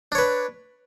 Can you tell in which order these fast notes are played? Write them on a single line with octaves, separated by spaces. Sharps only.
D4 C#5 B4